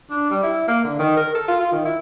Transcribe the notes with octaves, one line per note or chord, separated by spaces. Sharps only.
D4
G3
E4
A#3
D3
D#3
A#4
A4
F4
F4
D#3
E4